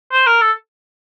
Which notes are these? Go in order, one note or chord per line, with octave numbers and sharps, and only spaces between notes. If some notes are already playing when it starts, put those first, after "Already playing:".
C5
A#4
A4